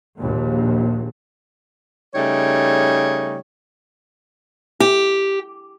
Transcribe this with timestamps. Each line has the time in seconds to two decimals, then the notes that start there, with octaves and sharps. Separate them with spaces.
0.17 A#1 D#2 A#2
2.14 C#3 G3 A3 D#4 C#5
4.80 G4